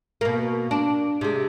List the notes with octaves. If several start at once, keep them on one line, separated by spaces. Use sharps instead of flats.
B2 A#3
D4
C3 G#3